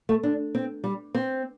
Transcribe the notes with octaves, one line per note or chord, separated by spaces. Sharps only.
A3
D4
C4
G3
C4